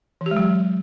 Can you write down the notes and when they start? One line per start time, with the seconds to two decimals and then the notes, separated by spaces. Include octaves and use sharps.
0.21 E3
0.26 G4
0.31 G#3
0.37 F#3